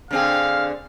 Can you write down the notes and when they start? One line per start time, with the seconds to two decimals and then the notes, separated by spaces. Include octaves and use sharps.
0.11 D3 C4 G#4 F5